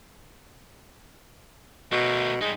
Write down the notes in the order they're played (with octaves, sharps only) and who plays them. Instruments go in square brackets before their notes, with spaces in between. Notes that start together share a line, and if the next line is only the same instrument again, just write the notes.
[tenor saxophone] B2 [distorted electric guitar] A3 A#4
[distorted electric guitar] G3 D#4 [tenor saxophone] G#3